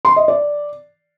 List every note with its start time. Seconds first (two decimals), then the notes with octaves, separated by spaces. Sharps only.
0.05 C6
0.16 D#5
0.28 D5